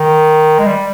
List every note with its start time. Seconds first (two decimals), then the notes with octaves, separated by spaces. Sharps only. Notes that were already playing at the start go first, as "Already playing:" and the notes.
Already playing: D#3
0.59 G#3
0.66 G3